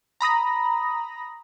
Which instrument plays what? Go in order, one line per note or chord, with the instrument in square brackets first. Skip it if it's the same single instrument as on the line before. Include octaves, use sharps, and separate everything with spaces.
[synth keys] A#5 B5 D#6 A#6